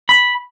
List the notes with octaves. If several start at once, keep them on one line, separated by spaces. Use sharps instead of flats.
B5